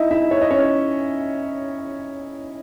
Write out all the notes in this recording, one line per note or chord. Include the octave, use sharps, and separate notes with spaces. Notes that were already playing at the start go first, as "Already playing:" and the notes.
Already playing: D#4 E4 D#5 E5
E4 E5
C#5
D#5
C#4 C#5